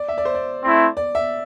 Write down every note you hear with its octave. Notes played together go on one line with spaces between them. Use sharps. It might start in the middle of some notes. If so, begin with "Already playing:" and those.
Already playing: D5
E5
D5
C5
D5
A3 C4 E4
D5
E5